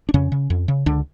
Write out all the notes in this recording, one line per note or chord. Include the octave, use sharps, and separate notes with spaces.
D4
F2 C#3 C#4
C#3
F2
C#3
C#2 D3 D4